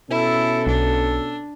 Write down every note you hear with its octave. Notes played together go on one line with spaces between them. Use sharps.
B2 C#4 E4 A4
B1 D4